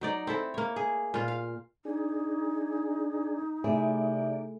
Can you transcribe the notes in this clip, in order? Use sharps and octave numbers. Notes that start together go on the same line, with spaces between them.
F#3 D#4 D5
C4 E4 A4
A#3 C#5
G#4
A#2 F4
F5
D4 D#4 G#4
C3 A3 E4 G#4 D5